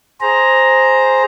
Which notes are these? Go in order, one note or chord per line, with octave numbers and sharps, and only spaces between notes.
G#4 C5 A#5